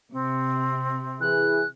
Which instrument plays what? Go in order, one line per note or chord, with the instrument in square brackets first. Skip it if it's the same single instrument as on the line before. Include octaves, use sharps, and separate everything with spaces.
[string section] C3 [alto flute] C4
[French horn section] E3 G#4 [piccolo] F#6